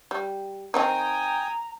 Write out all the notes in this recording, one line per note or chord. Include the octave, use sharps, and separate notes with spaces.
G3
D#3 C4 D#4 G5 G#5 A#5 D#6